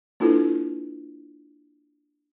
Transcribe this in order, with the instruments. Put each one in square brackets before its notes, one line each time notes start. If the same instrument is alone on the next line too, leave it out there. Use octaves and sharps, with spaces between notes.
[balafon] A#3 D4 E4 F4 A4 B4